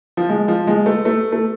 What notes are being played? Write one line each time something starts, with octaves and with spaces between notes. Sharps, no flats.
F3
G#3
F3
G#3
A3
A3
A3